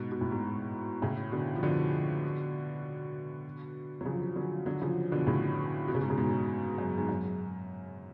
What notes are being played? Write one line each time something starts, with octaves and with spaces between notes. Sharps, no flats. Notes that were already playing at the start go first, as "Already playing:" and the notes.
Already playing: G#2 B2
B2
A2
G#2 B2
A2 C#3
B2 D3
F3
B2 D3
F#3
C#3 F3
D3 F#3
D3 F#3
C#3 F3
B2 D3
A2 C#3
B2
C#3
G#2 B2
C#3
G#2 B2
F#2
G#2
F#2